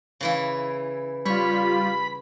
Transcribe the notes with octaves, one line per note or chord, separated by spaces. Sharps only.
C#3 E3 E4
G3 F4 C#5 B5